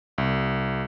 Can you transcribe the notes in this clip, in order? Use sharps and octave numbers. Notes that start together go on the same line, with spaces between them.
C2